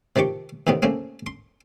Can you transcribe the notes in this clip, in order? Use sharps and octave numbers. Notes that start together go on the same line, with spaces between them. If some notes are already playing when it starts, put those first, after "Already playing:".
C3 D#3 F3 G4 C#6
E2 A2 C3 D#3 B3
C#3 A3 A#3 C4
C6